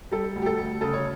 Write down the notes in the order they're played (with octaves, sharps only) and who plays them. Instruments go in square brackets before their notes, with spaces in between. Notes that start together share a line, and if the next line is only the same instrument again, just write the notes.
[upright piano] G3 A4
D2
G4
A4
D2
C#3 A4
C#5